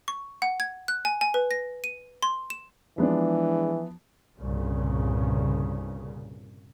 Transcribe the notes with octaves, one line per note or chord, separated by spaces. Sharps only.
C#6
F#5
G#6
F#6
G#5
G#5
B4
A#6
D#7
C6
E7
E3 F3 G#3 B3 D4
C2 G2 A#2 C#3